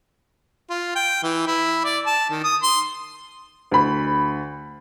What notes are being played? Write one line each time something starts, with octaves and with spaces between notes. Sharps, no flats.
F4
G5
E3
E4
D5
A5
D#3
D#6
C6
D2 B5